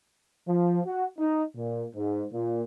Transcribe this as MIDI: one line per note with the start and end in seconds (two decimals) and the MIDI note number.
0.48 0.81 53
0.85 1.07 66
1.19 1.44 63
1.56 1.86 46
1.95 2.25 44
2.33 2.63 46